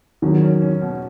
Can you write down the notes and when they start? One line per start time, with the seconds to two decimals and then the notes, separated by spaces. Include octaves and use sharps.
0.22 E2 D#3 F#3
0.42 C#4
0.62 C#4
0.82 B2